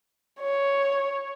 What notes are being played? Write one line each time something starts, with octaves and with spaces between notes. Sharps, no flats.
C#5